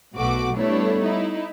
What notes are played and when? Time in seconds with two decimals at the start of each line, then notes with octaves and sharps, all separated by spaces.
0.17 B1 B2 A3 F#4 D6
0.55 G3 A3 B3 D4 E4 C#5
1.02 D#4 E4